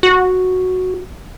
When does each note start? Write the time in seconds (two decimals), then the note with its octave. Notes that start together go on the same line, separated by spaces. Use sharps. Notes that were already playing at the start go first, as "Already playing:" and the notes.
0.03 F#4